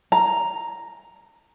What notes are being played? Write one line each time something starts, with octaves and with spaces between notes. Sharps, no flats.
A#5